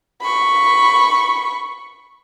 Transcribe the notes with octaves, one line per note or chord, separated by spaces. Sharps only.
B5 C#6